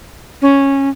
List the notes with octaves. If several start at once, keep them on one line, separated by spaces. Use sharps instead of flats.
C#4